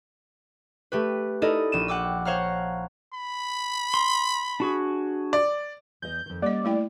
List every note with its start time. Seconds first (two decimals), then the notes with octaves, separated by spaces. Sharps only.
0.92 A3 G4 B4
1.42 D#4 E4 A4 A#4 D5 D#5
1.72 A#1 D#7 E7
1.88 F#5 G5 D6 E6
2.25 C5 C#5 F5 F#5 A#5 F6
3.14 B5
3.94 C6
4.60 D4 F#4 G#4
5.33 D5
6.02 E2 D#5 G6
6.26 F2 D#3
6.42 G3 A#3 C#4 D5 D#5
6.65 A3 E4 G5